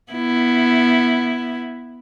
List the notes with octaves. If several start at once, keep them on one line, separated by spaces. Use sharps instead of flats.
B3 E4